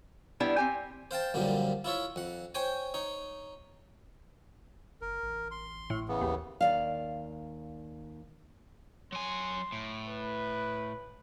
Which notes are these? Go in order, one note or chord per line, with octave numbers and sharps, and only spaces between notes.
G3 B3 D4 E4
C4 G4 G#5
C5 F5 G5 A5
F#2 A#2 D3 F3 G3
E4 F4 C#5 E5
F2 F#5
C5 C#5 G5 G#5
D#4 C#5
F#1 A#4
A1
C6
A2
C#3 E3 B3
D#2
D#2 D5 F5
F#3 G#5 C6
A2
B4